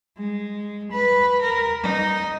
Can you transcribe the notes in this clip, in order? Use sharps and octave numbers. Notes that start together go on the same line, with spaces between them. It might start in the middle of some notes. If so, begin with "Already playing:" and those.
G#3
B4
A#4
D#4